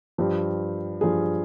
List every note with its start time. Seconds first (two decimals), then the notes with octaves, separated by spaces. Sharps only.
0.18 G2 F3 G4
1.01 G2 F3 G#4